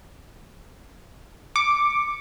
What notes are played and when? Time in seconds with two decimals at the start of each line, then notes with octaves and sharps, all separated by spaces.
1.56 D6 C#7